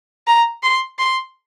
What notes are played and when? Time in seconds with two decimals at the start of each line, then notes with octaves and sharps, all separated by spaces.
0.27 A#5
0.63 C6
0.99 C6